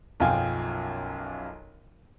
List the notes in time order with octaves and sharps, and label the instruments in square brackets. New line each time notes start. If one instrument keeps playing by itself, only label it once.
[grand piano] B1 F#2 F3 F4 G5 G#5